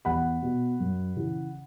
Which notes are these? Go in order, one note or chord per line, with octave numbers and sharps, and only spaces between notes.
E2 F#5 B5
B2
F#2
C#3 E3